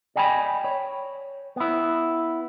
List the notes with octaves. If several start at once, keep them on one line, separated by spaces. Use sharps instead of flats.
D5 D#5 G5 G#5 A#5 B5
C#5
B3 E4